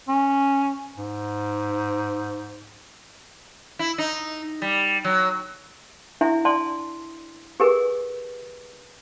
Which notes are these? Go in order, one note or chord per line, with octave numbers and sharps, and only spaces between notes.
C#4
G#2
E4
D#4
G3
F#3
D4 E4 E5 G#5
D5 G#5 A5 C6
G4 G#4 A#4 B4 G#5